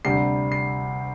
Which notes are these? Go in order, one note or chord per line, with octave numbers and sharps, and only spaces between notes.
D2 C3 G3 C7
C7